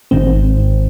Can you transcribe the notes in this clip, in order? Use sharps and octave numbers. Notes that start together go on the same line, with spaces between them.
G#1 G#2 D#3 C4